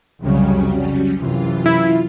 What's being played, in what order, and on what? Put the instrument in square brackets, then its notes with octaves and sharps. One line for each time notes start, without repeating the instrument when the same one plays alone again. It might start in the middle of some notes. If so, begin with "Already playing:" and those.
[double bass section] C2 F2 C#3 [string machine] F#3 G3 C#4
[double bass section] F#2 C3 E3 [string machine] F4
[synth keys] E4